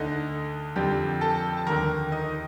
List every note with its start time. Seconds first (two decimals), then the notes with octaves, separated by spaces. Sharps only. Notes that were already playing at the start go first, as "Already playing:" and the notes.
Already playing: D2 D3 D#4 D#5
0.76 F2 D3 G4 G5
1.21 A4 A5
1.57 A5
1.67 D#2 D3 A#4 A#5
2.12 D#4 D#5